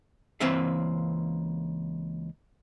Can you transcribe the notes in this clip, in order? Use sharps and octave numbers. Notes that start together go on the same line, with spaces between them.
C#2 E3 A#3 C4 E5 F5